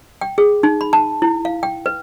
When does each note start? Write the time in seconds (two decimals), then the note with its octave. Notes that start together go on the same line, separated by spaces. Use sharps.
0.21 G5
0.38 G#4
0.63 D#4
0.81 B5
0.93 A5
1.22 E4
1.45 F5
1.63 G5
1.86 B4